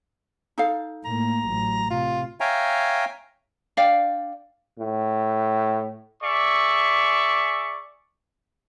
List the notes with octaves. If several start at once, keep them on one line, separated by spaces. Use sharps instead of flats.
D#4 A4 F5
A2 A#3 A#5
A1 F#3
C3 F4
C#5 E5 F5 G5 G#5 A#5
D4 D5 F5 G5
A2
G#4 D5 E5 C#6